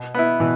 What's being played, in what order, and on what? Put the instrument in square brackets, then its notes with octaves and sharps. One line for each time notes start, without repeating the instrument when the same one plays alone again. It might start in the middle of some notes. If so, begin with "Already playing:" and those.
Already playing: [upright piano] B2
[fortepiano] B3 E4
[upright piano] B2 [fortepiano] E3